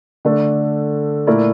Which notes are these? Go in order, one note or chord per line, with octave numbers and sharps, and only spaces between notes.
D3 A3 D4
A#2 A3 E4 A#4 D5